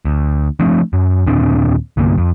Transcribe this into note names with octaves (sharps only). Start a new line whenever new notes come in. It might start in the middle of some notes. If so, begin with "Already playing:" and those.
D2
F3 A3 C4 D4
F#2
D#2 A#2 C4 D4
C2 G2 D3 A#3
F2